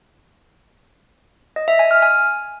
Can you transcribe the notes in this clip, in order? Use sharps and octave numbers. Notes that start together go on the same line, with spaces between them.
D#5
E5
G#5
F6
G#5